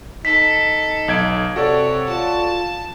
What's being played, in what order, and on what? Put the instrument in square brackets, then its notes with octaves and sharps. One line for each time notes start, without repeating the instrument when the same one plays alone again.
[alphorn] D#4 [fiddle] A4 [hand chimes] B6
[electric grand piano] B1 G#6 D7
[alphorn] C3 [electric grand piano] F#4 A4 D5 [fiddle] C#5
[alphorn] F4 [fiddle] A5